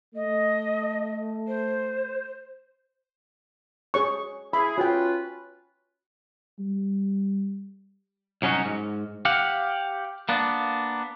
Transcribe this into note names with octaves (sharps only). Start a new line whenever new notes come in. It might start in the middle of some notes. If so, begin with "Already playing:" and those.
A3 D#5
C5
G#4 C#5 C#6
E4 G#4 B5
C#4 F4 F#4 B4 G5
G3
C2 F#3 C#4 D#4 F#4
G#2
G4 F5 F#5
A#3 B3 D4